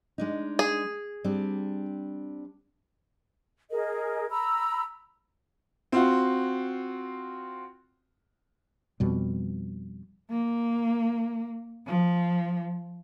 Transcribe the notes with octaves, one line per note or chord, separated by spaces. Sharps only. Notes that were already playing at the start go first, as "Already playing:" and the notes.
G#3 D4 D#4
G#4
G3 C4 D4
G#4 A#4 D#5
A#5 B5 E6
C4 F4 F#4
F2 B2 G3
A#3
F3